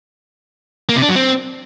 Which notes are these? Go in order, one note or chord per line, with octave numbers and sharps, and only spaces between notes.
A#3
C3
D4
F#3
C4